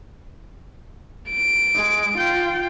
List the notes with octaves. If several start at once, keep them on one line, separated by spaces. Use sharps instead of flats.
D7
G#3
F4 G5